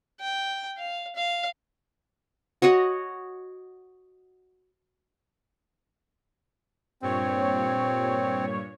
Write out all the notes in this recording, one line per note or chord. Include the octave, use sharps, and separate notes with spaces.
G5
F5
F5
F#4 C#5 D#5 F#5
G2 A#2 C4 C#5